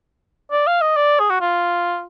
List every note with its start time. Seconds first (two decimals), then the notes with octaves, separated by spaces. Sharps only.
0.52 D5
0.67 F5
0.81 D#5
0.97 D5
1.20 G#4
1.30 F#4
1.41 F4